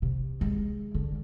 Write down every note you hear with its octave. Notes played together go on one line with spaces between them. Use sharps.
C3
G#3
D3